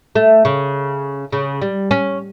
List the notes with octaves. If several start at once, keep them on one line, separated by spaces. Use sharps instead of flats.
A3
C#3
C#3
G3
C#4